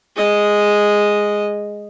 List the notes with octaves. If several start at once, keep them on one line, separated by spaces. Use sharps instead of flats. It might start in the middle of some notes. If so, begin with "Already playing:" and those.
G#3 D#5